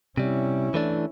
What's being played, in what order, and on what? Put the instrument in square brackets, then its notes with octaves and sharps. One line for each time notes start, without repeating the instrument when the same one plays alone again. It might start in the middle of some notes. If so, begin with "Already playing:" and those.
[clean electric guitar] C3 G3 [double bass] C#4 E4
[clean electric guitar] E3 A3 D4